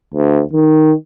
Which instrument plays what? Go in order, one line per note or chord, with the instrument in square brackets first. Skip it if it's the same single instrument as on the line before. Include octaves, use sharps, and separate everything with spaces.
[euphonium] D2
D#3